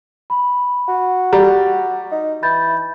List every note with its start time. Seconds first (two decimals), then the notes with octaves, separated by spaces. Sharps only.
0.30 B5
0.88 F#4
1.33 G3 A#5
2.11 D#4
2.43 E3 B5 G6 A6